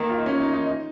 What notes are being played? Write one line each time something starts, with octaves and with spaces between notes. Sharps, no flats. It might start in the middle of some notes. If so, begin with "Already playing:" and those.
Already playing: D#3 A#3
F4
D#4
C#4
D#4
D#4
D#4